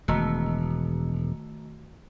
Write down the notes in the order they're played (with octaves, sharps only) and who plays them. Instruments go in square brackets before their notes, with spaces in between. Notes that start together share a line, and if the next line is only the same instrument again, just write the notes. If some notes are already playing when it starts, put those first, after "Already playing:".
[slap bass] E1 [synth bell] D#3 A3 F#4